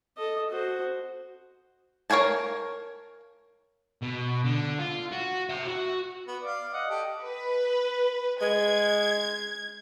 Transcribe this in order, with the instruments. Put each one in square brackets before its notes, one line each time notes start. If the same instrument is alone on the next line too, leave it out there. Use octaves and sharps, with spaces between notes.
[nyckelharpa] A4 D#5
F#4 C5
[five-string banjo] A#4 C#5 F5 G#5 A5
[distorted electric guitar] B2
D3
F4
F#4
E5 G5
F#4
[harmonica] B3
[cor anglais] D5 [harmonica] F5
[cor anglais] D#5 [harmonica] F#5
[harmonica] G4 A4
[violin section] B4
[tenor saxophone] G#3 [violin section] G#6